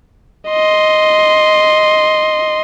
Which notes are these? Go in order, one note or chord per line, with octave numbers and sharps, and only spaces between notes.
D#5 C6